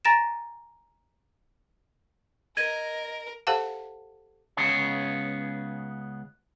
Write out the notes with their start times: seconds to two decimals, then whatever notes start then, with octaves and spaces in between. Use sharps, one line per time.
0.05 G#5 A#5 A6 A#6 D7 E7
2.57 A#4 D#5 G#6 D#7
3.47 G4 A4 C5 F5 F#5 A5
4.57 C#2 C#3 B3 G#4 C#5